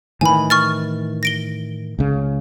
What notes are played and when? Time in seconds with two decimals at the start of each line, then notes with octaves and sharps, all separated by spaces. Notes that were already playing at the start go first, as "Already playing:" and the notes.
0.21 A2 D#3 E3 G#5 B5
0.50 C#6 F6 A6
1.23 A#6 D7 G7
1.99 C#2 C#3